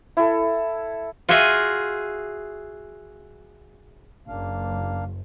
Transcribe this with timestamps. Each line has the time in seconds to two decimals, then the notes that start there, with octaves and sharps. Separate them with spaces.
0.17 E4 A4
1.29 F4 F#4 G#4 D#5 E5
4.28 F#1 A#3 D4 F5